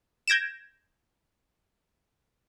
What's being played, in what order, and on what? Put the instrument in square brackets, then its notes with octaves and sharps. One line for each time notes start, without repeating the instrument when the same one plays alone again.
[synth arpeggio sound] G6 G#6 A#6 D7 E7